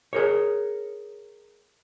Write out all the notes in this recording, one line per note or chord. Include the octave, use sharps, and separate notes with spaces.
G#4 A#4 C#5